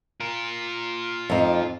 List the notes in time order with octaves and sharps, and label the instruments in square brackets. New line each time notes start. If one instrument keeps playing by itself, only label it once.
[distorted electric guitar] F4 A#4
[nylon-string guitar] F2 D#4